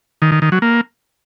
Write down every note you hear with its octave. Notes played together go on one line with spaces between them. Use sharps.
D#3
D#3
D#3
F#3
A#3